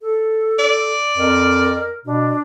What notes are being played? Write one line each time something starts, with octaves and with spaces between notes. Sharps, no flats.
A4
D5
F2 A#4
B2 D4